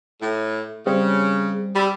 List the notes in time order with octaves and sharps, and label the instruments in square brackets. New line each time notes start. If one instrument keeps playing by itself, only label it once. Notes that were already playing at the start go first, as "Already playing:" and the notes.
[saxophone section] A2
[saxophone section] C#3 [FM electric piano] G3 C4
[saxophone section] G3 [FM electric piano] B5 E6